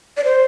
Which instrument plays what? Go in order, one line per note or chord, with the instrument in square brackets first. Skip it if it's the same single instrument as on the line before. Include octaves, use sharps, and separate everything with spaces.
[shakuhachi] D5
C5